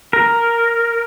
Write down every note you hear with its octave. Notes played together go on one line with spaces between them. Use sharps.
A#4